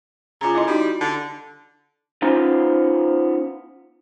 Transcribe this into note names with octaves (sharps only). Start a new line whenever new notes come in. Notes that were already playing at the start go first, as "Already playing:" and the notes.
C#3 F4 A#5
E4 D#5 C6
G3 D#4 F#4
D3
B3 C#4 D#4 F4 C5